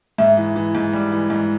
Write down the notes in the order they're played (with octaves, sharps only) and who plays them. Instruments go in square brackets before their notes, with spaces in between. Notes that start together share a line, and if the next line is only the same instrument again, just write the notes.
[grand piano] G#2 [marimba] E5
[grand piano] E3
E3
G#2
G3
E3
G#2